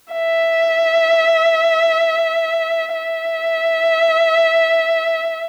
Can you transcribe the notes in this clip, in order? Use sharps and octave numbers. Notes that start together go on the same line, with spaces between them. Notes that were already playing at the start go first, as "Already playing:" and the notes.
E5
E5